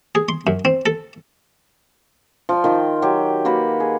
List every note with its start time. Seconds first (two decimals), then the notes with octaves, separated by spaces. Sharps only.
0.15 G#4
0.29 C6
0.47 F#2
0.65 C4
0.86 A4
2.49 F3 D5
2.64 D#3 F4 G5
3.02 F#3 G4
3.45 A#3 F#4 G4 B4
3.80 G#4